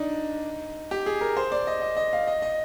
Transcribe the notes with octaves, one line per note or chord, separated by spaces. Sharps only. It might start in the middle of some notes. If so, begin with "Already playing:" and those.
Already playing: D4 D#4
G4
G#4
A#4
C5
D5
D#5
D#5
D#5
F5
D#5
D#5